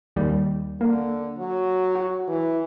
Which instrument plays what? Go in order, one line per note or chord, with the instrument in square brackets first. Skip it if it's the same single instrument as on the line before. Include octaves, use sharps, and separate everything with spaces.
[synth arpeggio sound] D#2 G3
[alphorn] D3 [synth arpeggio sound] A#3
[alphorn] F#3
[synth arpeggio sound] F#4
[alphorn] E3